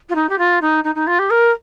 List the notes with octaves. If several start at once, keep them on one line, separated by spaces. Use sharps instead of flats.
F4
D#4
G4
F4
D#4
D#4
D#4
F4
G4
A#4